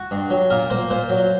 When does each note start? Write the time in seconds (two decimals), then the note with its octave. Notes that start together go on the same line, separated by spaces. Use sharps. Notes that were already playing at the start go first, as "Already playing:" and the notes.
Already playing: F#4
0.11 G2
0.30 F#3
0.50 A#2 A#4
0.70 A#3 C5
0.90 A#2 C5
1.10 F#3